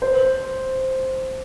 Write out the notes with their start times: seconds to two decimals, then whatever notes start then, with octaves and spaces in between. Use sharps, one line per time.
0.02 C5